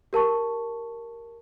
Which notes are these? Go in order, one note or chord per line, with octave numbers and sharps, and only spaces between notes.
G4 A#4 A5 C#6